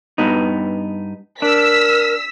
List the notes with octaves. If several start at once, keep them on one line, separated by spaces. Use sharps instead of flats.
G2 B3 D#4
D4 A#4 E6 B6